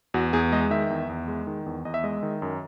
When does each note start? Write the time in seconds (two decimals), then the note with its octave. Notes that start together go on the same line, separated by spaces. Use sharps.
0.14 E2 F#4
0.33 E2 G#4
0.52 G#3 D#5
0.71 D#3 E5
0.90 E2
1.09 E2
1.28 G#3
1.47 D#3
1.66 E2
1.85 E2 D#5
1.94 E5
2.04 G#3 D#5
2.23 D#3
2.42 F#2